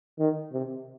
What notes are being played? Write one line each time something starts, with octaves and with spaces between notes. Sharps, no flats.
D#3
C3